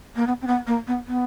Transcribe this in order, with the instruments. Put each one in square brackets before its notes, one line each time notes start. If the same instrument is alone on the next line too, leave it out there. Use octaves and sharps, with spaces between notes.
[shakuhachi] A#3
B3
C4
B3
A#3
B3
B3